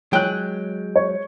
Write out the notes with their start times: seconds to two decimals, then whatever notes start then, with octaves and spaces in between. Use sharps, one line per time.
0.13 F#3 G#3 G5 F#6
0.96 C#5